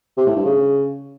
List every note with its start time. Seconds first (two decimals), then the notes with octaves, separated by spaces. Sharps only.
0.17 C3
0.27 A2
0.36 G2
0.45 C#3